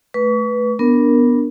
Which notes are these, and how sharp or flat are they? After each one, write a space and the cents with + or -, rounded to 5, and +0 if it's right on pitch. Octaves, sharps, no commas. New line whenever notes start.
A3 -15 B4 -5 C#6 +40
B3 -10 D4 -5 A#4 +0